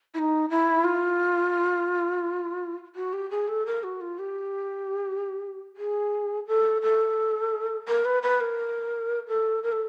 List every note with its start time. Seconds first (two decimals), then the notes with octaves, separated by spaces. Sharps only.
0.14 E4
0.19 D#4
0.50 E4
0.84 F4
2.95 F#4
3.13 G4
3.31 G#4
3.48 A4
3.66 A#4
3.83 F#4
4.01 F4
4.19 G4
5.77 G#4
6.47 A4
6.82 A4
7.88 A#4
8.05 B4
8.23 B4
8.40 A#4
9.28 A4
9.63 A#4
9.72 A4